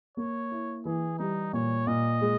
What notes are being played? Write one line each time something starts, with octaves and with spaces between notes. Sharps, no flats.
A#3 C#5
E4
E3 G#4
G3 D#4
A#2 C#5
A#2 D#5
G#3